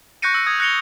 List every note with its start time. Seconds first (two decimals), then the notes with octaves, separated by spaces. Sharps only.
0.22 C#6 F#6 G6 A#6 C#7 D#7
0.34 E6 C#7
0.47 D#6 G#6
0.60 F#6 A#6 C#7 F7 G7